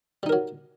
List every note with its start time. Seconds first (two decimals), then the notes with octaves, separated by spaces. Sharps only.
0.23 G3
0.26 D#4
0.29 A#4
0.33 F#3